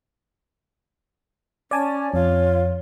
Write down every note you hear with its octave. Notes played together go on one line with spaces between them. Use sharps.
C#4 D5 G#5 A5
F2 F4 C#5